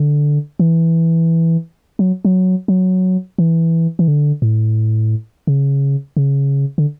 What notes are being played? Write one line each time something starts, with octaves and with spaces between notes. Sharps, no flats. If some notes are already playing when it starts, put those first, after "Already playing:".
Already playing: D3
E3
F#3
F#3
F#3
E3
E3
D3
A2
C#3
C#3
D3